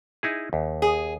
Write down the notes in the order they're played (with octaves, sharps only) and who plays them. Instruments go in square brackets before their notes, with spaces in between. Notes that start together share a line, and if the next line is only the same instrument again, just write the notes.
[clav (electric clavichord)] D#4 E4 G#4
D#2
[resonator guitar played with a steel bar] G#4